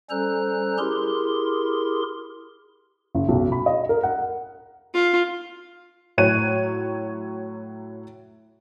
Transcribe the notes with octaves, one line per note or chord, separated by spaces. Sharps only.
G3 C#4 A4 C5 A#5 F#6
E4 G4 G#4 A#4 C6
F#1
B1
B5
D#5
A#4
F#5
F4
A2 F#3 C#5 F#6 D#7